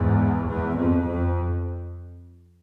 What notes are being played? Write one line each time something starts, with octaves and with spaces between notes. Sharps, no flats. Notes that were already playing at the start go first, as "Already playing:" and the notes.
Already playing: E2 G#2
E2
F2
F2